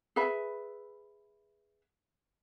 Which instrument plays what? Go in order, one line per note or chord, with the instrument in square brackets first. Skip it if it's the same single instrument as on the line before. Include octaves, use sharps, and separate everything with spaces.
[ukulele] G#4 B4 E5 B5